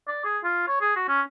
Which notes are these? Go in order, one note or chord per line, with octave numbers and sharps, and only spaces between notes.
D5
G#4
F4
C#5
G#4
F#4
C#4